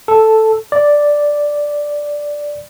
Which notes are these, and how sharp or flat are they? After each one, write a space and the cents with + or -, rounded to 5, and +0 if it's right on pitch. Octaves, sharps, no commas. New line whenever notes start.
A4 +0
D5 +0